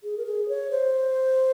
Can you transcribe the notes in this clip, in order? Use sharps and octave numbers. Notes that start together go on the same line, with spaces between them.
G#4
A#4
G#4
C#5
C5